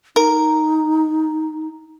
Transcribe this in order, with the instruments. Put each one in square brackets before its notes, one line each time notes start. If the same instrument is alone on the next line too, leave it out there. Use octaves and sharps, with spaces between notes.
[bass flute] D#4 [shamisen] A#4 [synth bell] A#5